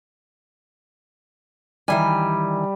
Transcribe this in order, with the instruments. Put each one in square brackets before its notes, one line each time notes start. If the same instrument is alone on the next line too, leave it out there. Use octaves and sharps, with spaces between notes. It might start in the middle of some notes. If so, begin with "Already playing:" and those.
[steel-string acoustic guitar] D#3 E3 G#5 [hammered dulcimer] G3